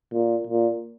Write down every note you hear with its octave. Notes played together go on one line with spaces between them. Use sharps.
A#2
A#2